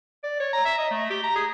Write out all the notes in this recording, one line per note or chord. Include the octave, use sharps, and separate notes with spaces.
D5
C#5
A#5
E5
D#5
A3
G4
A#5
G#4